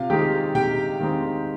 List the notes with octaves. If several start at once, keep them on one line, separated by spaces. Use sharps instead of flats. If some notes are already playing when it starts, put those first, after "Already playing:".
Already playing: C3 F4 F5
D#3 G#3 C4 D#4 G4 G5
C3 G4 G5
D#3 G#3 C4 D#4